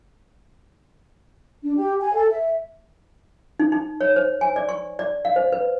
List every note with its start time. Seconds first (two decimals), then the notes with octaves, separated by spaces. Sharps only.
1.63 D4
1.76 G4
2.00 G#5
2.14 A4
2.31 E5
3.60 D#4
3.72 D#4
4.01 C#5
4.16 C5
4.41 G#5
4.56 D5
4.69 C#6
4.99 D5
5.25 F5
5.36 C5
5.52 B4